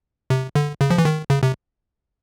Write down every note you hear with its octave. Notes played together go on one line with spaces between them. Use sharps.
C3
D3
C#3
F3
E3
D#3
C#3
C3